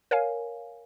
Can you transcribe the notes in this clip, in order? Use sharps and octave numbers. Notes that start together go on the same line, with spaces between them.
A#4 C#5 F5 G#5